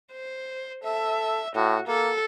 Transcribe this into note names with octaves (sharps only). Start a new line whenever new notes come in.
C5
A4 E5
A2 F#4
A#3 A4